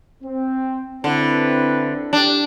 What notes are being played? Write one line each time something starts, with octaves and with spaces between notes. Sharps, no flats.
C4
D3 C4 E4 B4
D4 G4